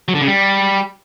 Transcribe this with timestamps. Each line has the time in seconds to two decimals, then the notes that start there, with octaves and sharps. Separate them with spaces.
0.08 F#3
0.15 D3
0.21 C#3
0.27 G3